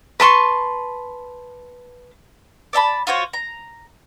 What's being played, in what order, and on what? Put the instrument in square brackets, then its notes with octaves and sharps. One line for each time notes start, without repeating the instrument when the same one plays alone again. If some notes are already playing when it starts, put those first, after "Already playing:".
[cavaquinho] B4 A5 C6 C#6
[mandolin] D5 E5 A5 B5
F4 F#4 C5 C#5
A#5